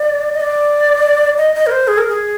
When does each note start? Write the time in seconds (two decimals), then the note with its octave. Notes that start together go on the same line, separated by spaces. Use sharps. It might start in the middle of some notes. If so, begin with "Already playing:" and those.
Already playing: D5
0.34 D#5
0.41 D5
1.38 D#5
1.55 D#5
1.67 A#4
1.71 C5
1.88 G#4
1.98 A#4
2.09 G#4